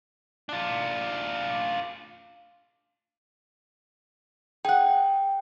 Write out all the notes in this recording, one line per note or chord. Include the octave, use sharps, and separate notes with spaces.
D4 F4
G#4 F#5 G5